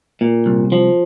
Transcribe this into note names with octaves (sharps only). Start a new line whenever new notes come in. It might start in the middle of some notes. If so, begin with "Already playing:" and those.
A#2
C2
F3